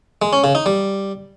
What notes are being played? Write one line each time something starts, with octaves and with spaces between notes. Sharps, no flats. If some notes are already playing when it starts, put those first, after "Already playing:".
G#3
C#4
C#3
D#4
G3